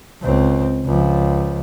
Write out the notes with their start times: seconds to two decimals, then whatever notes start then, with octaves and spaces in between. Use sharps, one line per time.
0.22 C#2 C4
0.86 C#2 F3